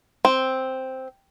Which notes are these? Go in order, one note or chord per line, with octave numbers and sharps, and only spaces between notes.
C4